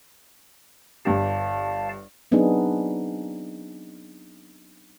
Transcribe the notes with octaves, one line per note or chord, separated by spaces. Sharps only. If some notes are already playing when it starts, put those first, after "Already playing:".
G1 G2 G4 D5 F5 A5
F#3 B3 C4 D4 D#4 G#4